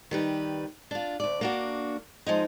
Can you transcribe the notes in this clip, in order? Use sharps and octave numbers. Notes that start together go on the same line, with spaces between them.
D#3 G3 B4
D4 F4
D2 D5
A#3 D4 F#4
F3 G#3 D#4